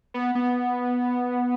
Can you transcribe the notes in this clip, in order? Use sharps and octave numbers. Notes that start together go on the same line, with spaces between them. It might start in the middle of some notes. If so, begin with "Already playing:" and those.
B3
B3